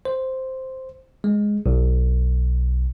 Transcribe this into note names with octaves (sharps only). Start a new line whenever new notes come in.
C5
G#3
B1